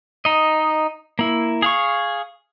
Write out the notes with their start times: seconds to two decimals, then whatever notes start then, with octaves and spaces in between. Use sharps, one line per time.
0.25 D#4 D#5
1.19 A#3 E4
1.62 G#4 F5 C#6